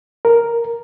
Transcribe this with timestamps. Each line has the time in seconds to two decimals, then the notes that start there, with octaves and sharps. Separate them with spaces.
0.25 A#4